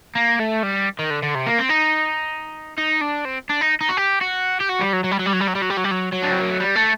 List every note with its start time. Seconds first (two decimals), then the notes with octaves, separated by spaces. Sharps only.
0.15 A#3
0.39 A3
0.63 G3
0.99 D#3
1.10 D3
1.22 D3
1.35 C3
1.46 A#3
1.59 C4
1.70 D#4
2.78 D#4
3.01 D4
3.25 C4
3.49 D4
3.61 D#4
3.81 D#4
3.89 F#4
3.97 G4
4.21 F#4
4.60 G4
4.69 F#4
4.80 G3
4.93 F#3
5.04 F#3
5.12 G3
5.19 F#3
5.26 G3
5.34 F#3
5.41 G3
5.48 F#3
5.55 G3
5.62 F#3
5.70 G3
5.77 F#3
5.84 G3
5.91 F#3
6.12 F#3
6.23 D4
6.31 C4
6.40 A#3
6.50 A3
6.60 G3
6.75 A3